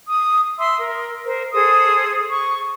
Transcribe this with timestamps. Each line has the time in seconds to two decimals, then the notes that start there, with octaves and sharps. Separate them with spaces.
0.08 D#6
0.59 E5 C6 E6
0.79 A#4
1.26 A#4 C5
1.53 G#4 A4 C5 D#6
2.29 C#6